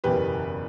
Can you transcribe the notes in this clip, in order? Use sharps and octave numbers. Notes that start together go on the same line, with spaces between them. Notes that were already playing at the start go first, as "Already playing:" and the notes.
F#1 E2 B2 G4 B4